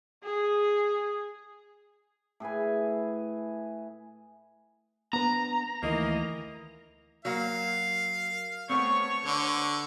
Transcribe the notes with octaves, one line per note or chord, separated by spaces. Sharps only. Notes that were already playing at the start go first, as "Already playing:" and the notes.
G#4
A2 G#4 B4 G#5
B3 D4 B4 A#5
D2 D#3 E3 A3 A#3 D#5
F#3 A#3 F5
A3 B3 C4 C#5 C#6
D3